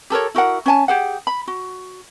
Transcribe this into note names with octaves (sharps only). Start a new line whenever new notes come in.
G4 A4 A#4 C#5
E4 F#4 A#4 F#5
C#4 C#5 G#5 A5
G4 G#4 F#5
B5
F#4